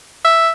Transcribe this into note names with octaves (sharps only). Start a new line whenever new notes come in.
E5